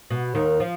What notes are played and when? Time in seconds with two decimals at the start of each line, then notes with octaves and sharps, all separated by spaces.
0.10 B2
0.35 D#2 D#3
0.60 F3